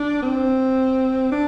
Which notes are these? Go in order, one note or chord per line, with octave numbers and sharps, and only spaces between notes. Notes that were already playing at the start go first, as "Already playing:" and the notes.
Already playing: D4
C4
D4